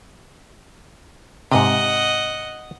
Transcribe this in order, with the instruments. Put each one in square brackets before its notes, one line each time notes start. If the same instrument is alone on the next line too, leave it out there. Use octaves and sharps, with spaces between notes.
[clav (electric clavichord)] G#2 C3 [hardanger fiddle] D#5 F#5